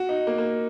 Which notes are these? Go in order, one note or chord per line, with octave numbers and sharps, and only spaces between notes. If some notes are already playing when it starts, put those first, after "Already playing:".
Already playing: F#4
D#4
A#3
A#3